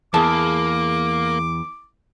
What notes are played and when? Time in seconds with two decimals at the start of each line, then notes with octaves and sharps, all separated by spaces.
0.14 E2 A#3 G#4 A5 D6